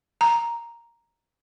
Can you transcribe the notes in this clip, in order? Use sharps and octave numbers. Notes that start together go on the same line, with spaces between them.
A#5